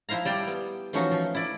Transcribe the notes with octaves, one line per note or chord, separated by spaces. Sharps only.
F3 E4 C5 F5 A#5
G3 D5 G5 A5
B3
E3 F3 A3 C#4 D#4 F#4
F3
E4 D5